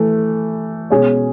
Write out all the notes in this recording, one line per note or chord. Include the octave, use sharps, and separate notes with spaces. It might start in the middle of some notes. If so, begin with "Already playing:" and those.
Already playing: E3 A3
B2 G#3 C#4 G#4 C#5